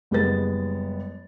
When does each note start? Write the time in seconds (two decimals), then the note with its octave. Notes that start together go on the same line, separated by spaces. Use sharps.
0.11 F#1 G3 G#3 B3 A6